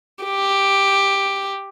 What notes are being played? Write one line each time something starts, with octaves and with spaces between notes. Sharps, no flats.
G4